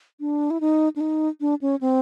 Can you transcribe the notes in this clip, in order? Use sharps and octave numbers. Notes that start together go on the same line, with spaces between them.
D4
E4
D#4
D4
D#4
D4
C#4
C4